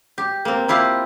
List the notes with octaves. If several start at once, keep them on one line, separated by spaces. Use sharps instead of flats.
G4
A#3 C4
A#3 E4 F4 G4